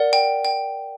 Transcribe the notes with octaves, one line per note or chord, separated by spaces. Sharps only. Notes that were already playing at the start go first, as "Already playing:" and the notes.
Already playing: A#4 D5 F#5
G5
G5